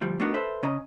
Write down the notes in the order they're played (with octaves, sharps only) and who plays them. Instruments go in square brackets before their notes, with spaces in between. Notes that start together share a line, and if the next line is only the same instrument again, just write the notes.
[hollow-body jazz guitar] D2 F3 G3
A3 B3 D4 D#4 F#4 A#4
A4 B4 C5 E5
C#3 C#4 D#5 A#5